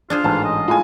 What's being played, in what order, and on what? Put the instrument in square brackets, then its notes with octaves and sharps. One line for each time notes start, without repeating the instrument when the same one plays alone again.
[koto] D4 G#4 C5 [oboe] F4
[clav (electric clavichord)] A1 G#2 [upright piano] A5
[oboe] D#5
[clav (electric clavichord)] A2 G#3 [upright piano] F4 G#5